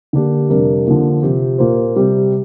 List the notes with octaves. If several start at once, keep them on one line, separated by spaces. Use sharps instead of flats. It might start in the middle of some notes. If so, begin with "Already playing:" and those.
D3 A#3 D4 G4
F2 C3 G3 D4 A#4
D3 F3 A#3
C3 F3 C4 G4
A#2 A#3 F4 C5
C3 G3 C4 G4